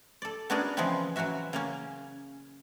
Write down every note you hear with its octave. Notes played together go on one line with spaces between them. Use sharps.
A4 D5
B3 C#4 D4 F#4 G#4 A#4
C#3 E3 F3 G#3 B3 C4
E3 F#3 C#4 F#4 E5
C#3 A#3 C#4